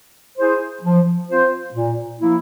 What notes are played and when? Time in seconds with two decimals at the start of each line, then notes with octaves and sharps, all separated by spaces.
0.38 E4 G#4 C5
0.84 F3
1.29 C4 F4 C5
1.75 A#2
2.20 F3 A#3 E4